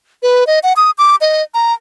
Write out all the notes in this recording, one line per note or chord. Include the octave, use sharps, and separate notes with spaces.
B4
D#5
F#5
D#6
D6
D#5
A#5